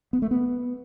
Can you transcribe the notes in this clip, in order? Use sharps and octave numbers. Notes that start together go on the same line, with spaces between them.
B3
A3
B3